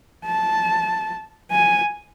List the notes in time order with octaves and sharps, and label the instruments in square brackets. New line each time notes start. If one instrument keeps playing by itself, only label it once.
[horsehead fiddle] A5
G#5